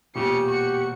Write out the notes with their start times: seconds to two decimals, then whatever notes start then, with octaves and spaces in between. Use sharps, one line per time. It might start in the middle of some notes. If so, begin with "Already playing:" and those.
0.15 E1 A#2 C#3 G4 C#7
0.46 F#4